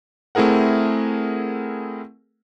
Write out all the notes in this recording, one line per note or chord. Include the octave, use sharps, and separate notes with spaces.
A3 C4 E4 G#4 A#4 F#5